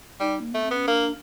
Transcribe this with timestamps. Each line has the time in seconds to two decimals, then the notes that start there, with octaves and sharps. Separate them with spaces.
0.20 G3 D#4
0.40 A#3
0.52 A3 B3
0.63 C4
0.71 B3 C#4
0.87 A#3 D4